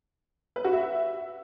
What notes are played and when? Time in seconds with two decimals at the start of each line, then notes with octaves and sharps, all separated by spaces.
0.56 B4
0.64 F#4
0.73 E5